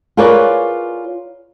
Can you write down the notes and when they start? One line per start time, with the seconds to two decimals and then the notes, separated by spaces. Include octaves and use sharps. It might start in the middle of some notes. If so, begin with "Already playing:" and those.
0.17 F4 G#4 A#4 B4 C#5 D5